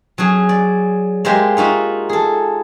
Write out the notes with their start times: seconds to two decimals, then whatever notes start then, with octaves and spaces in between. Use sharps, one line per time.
0.18 F#3 C#4 G#4
0.49 D5
1.25 G#3 A#3 G4 C5 E5
1.57 D#4 F4 F#4 E5
2.09 G#4 A4